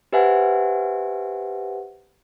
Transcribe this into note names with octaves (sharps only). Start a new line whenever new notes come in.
G4 B4 C5 E5 F#5 G#5